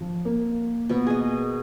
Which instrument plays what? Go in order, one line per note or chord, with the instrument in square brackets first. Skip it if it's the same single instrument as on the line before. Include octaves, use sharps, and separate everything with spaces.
[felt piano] F3
A#3
[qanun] B2 B3
G#4 D#5